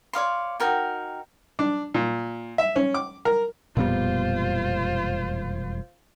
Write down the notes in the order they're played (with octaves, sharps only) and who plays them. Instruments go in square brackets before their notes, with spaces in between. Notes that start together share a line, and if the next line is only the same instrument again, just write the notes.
[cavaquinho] C#5 D5 F5 C6
D#4 F#4 A#4 G5
[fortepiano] D4
A#2
E5
C#4
D6
A#4
[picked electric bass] E1 F2 G3 [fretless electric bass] A#2 B3 [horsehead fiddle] F4 C5